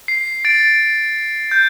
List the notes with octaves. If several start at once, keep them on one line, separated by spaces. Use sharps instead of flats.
C7
A6 D7
G6